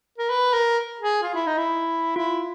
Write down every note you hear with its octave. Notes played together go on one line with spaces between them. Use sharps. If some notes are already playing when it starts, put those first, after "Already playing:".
A#4
B4
A#4
G#4
F4
E4
D#4
E4
E4 F4